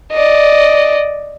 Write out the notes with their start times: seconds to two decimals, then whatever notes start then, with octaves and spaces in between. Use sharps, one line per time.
0.13 D5 D#5